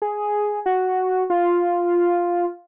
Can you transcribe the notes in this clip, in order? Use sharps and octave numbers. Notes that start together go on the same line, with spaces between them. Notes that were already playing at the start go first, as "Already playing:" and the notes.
G#4
F#4
F4